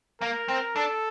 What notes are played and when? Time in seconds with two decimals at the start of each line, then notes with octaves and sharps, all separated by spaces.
0.20 A#3 A#4
0.48 C4
0.75 D4 A4